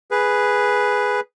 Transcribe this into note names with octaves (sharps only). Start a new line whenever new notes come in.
G#4 B4